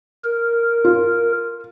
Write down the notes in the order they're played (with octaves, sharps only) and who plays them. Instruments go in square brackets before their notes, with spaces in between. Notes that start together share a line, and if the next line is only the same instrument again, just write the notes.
[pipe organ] A#4
[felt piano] F4